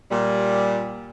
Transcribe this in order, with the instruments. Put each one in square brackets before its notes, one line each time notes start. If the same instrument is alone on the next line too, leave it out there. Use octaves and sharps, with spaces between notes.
[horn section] A#2 G3